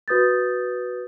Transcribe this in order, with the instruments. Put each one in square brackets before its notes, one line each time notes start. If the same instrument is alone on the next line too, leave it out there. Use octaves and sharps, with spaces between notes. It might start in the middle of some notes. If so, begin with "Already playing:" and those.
[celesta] F#4 B4 D#6 G6 A6